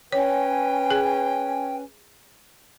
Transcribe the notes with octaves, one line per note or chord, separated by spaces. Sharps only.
C#4 B4 C#5 G5 G#5
G#4